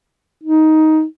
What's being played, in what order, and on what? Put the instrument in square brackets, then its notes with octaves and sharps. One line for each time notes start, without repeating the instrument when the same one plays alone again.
[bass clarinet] D#4